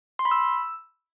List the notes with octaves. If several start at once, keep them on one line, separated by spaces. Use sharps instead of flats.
C6
B5
E6